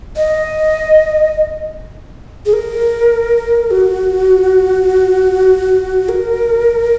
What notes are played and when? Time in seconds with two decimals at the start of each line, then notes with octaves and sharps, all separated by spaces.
0.16 D#5
2.46 G#4
2.53 A#4
3.71 F#4
6.09 A#4